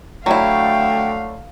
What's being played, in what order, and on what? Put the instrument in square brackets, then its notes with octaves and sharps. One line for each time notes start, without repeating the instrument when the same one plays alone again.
[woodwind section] D3 A3 [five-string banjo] F#3 E4 [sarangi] F5 [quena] G5